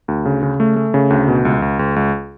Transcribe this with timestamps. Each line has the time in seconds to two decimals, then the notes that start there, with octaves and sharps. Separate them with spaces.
0.08 D2
0.25 C#3
0.43 C#3
0.60 A3
0.76 A3
0.94 C#3
1.10 D2
1.28 B2
1.45 C#2
1.62 C#2
1.79 C#2
1.96 C#2